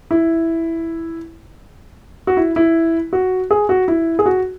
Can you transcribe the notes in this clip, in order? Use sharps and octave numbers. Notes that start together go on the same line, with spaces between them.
E4
F#4
E4
E4
F#4
G#4
F#4
E4
G#4
F#4